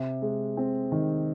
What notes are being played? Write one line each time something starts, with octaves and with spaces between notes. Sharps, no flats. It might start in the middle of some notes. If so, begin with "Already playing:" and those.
Already playing: C3
G#3
C4
D#3